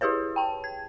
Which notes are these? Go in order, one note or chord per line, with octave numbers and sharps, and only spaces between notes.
E4 G4 G#4 B4 C#5
G5 A5
G#6